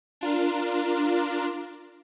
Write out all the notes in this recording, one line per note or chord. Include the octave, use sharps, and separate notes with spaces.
D4 F4 A#4